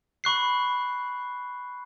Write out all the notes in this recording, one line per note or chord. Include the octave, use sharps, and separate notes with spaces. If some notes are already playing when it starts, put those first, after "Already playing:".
B5 C#6 F#6 C7